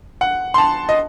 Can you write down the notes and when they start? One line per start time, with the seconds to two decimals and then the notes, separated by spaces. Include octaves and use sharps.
0.21 F#5
0.54 C6
0.58 A5
0.89 D#5